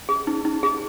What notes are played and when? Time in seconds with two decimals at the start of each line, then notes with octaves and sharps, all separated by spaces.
0.09 G#4
0.27 D#4
0.45 D#4
0.63 G#4